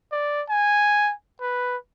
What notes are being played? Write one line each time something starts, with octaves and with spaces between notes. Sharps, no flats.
D5
G#5
B4